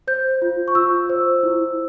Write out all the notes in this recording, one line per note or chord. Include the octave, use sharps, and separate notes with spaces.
C5 G6
F4
C#6
F4 E6
C5
E4